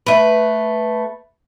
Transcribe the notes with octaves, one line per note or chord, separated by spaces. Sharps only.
A3 B4